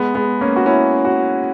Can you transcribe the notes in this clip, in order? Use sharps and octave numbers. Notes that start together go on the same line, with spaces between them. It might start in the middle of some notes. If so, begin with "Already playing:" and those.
Already playing: G#3 B3
G#3 B3
A#3 C#4
F#4
C#4 E4
F#4